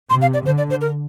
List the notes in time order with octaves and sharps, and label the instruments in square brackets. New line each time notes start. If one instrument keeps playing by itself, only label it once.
[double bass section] C3 [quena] C6
[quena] F5
D5
[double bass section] D3 [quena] C5
[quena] D5
C5
A#4